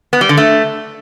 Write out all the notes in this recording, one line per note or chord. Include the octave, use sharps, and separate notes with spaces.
B3
G3
D3
A3